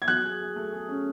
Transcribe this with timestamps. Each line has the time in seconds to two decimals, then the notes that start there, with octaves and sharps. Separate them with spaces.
0.02 G#6
0.08 F#3 F#6
0.24 G#4
0.40 G#4
0.56 A3
0.73 G#4
0.89 C#4